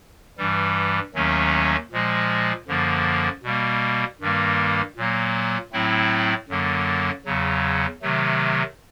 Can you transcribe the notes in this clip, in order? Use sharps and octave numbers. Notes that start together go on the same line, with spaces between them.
G2 E3 G3
D#2 D#3 F#3 A3 C#4
A#2 F3 G#3
F#2 D3 F3 A#3
B2 G3 A#3
G2 D#3 G3 A#3
A#2 F#3 A#3
A2 F#3 A3 C4 E4
F#2 D3 F#3 A#3
E2 C#3 F#3
C3 D#3 F#3 A3